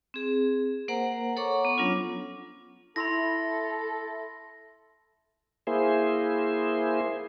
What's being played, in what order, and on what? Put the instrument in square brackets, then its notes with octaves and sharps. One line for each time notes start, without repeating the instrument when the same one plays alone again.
[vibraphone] C4 G#4
A#3 A#4 C5 F#5 A#5
A4 C#5 F#5 A#5 C#6 D6
B3 D6
F#3 C#4 D4 F4
[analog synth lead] E4 [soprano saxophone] A4 [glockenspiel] B5 C6 A#6
[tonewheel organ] A#3 E4 G#4 C5